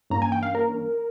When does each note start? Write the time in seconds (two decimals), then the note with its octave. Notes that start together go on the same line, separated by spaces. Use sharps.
0.10 G2 E3 A#3 C#4 A#5
0.22 G#5
0.32 G5
0.43 F5
0.55 A#4